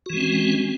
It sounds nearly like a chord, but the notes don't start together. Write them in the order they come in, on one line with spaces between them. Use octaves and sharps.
F#4 E3 G#3 C4 C#4